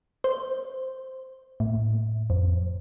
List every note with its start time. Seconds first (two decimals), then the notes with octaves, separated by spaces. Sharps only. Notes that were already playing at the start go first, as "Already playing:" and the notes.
0.24 C5
1.60 A2
2.30 F2